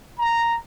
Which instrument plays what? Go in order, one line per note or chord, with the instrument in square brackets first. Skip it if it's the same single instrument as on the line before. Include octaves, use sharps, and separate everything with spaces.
[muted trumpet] A#5